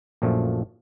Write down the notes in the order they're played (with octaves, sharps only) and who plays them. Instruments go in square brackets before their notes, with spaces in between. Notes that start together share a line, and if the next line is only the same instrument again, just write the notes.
[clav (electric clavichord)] A#1 F#2 A#2 F3 A3